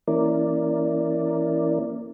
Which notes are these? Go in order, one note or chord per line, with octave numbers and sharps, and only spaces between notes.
E3 A#3 C#4 E4 A#4 D5